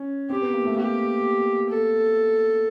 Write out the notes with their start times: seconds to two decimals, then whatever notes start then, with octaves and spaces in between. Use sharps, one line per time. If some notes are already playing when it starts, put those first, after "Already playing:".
Already playing: C#4
0.30 C4 G4
0.42 B3
0.54 A#3
0.65 A3
0.76 A#3 G4
1.70 A4